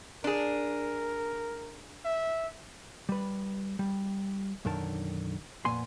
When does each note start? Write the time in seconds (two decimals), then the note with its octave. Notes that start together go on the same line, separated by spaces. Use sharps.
0.24 D4 G#4 A#4
2.05 E5
3.09 G3 B4
3.79 G3
4.65 B1 F#2 D3 D#3 A#4 A5
5.65 F2 A#2 A#3 B3 G#5 C6